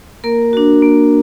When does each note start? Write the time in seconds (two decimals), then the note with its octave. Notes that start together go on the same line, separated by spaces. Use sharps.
0.24 A#3 A#4
0.53 D4 F#4
0.82 A#3